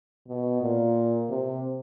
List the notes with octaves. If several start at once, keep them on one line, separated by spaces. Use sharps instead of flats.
B2
A#2
C3